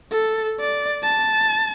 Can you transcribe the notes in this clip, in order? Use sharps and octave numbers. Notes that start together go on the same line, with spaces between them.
A4
D5
A5